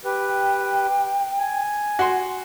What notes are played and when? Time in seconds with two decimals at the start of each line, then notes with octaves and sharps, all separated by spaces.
0.05 G4 B4 G5
1.39 G#5
1.99 F#4 C6